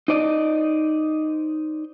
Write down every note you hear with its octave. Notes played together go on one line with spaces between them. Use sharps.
D#4 C5 D5 D#5